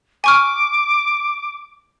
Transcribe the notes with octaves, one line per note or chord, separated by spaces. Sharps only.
G#5 C#6 D6 F6